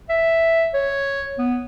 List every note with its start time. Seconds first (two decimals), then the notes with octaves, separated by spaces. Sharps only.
0.09 E5
0.74 C#5
1.38 B3